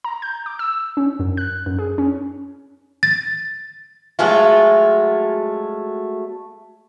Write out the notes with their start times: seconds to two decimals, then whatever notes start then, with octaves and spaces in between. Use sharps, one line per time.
0.04 A#5
0.22 G6
0.46 D6
0.59 E6
0.97 C#4
1.19 F#2
1.37 F#6
1.66 F#2
1.79 G#4
1.98 C#4
3.03 A6
4.19 F#3 G#3 A3 F4